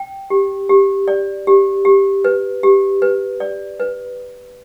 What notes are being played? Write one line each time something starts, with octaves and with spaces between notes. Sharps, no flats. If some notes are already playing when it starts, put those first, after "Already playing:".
Already playing: G5
G4
G4
D5
G4
G4
B4
G4
B4
D5
B4